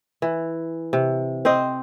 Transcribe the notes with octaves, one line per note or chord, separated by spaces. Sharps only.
E3
C3
C4 C5 D#5